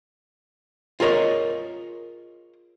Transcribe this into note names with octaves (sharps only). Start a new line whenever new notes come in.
F4 G#4 A#4 C#5 D#5